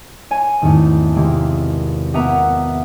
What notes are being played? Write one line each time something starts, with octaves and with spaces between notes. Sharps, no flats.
C#5 G#5
G#1 E2 A3
C3 G#3 A#3
A#3 B3 A#4 E5 F#5 A#5